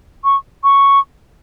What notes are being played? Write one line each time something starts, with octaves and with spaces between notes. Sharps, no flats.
C#6
C#6